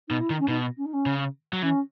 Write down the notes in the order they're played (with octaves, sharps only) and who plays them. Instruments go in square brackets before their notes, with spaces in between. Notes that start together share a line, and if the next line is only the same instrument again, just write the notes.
[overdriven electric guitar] B2 [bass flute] D#4
[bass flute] E4
[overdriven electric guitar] D#3
[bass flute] C#4
[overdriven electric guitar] B2 [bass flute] D#4
[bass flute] C#4
D#4
C#4
[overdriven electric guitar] C#3
F#3
[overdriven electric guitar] E3 [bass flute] C#4